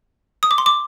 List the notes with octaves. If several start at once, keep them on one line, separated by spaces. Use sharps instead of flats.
D#6
D6
C6
D6